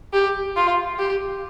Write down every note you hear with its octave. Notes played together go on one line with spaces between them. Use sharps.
G4
F4
G4